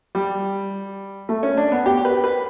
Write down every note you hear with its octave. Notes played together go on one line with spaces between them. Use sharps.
G3
A3
C#4
D4
B3
G4
B4
B4